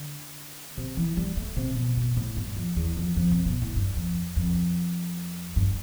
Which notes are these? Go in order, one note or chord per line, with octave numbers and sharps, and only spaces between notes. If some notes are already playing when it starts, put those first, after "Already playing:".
Already playing: D3
C3
E3
G3
A3
C3
B2
B2
A2
G2
F2
E2
F2
F2
C3
B2
A2
G2
F2
F2
G2